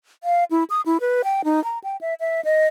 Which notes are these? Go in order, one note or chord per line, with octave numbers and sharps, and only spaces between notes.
F5
E4
D#6
E4
B4
G5
D#4
A#5
G5
E5
E5
D#5